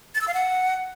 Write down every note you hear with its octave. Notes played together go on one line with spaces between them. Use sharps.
A6
E6
F5
F#5